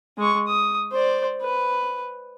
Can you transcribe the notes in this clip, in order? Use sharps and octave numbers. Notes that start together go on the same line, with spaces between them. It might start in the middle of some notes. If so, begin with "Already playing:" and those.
G#3 C#6
D#6
C5 D5
B4